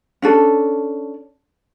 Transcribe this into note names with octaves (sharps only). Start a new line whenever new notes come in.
C#4 D4 A4